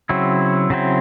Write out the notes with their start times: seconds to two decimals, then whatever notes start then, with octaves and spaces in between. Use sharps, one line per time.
0.09 C#3 F#3 C4 E4
0.70 C#3 F#3 C4 E4